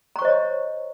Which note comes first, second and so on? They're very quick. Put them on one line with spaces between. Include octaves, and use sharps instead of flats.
A#5 C#6 C5 D#5 C#5